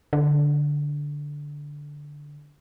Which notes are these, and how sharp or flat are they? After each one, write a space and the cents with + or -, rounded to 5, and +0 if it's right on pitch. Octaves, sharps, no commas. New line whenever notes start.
D3 -5